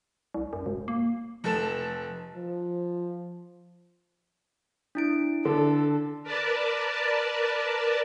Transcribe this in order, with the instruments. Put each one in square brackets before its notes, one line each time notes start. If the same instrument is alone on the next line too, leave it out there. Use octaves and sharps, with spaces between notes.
[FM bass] C2
F#2
E1
A#3
[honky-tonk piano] F1 A4 E7
[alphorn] F3
[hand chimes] D4 E4 D7
[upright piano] D3 [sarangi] A4
[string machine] A#4 B4 D5 A5